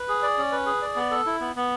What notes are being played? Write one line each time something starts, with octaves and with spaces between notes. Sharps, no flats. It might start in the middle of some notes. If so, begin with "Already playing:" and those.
Already playing: B4
G#4
D5
C#4
B4
G#4
D5
B3
A4
E4
B3
B3